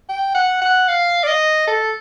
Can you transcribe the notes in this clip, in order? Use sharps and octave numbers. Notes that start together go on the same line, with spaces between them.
G5
F#5
F#5
F5
D5
D#5
A4